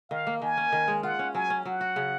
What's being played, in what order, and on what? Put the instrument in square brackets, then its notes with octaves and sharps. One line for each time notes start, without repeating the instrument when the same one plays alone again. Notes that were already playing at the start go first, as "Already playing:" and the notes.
[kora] D#3 [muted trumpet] F5
[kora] A#3
[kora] D#3 [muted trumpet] G#5
[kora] C#4
D#3
G#3
[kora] F4 [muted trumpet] F#5
[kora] C#4
[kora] F#3 [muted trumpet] G#5
[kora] C#4
[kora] F#3 [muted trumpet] F#5
[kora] F#4
C#3